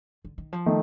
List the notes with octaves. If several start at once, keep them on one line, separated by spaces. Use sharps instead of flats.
D3
D#3
F3
D#3 A3